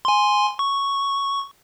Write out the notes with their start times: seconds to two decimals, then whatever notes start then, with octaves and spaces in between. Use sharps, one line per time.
0.05 G#5 C6
0.59 C#6